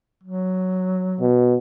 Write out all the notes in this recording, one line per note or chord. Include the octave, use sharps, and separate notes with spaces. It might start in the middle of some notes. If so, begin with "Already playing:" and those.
F#3
B2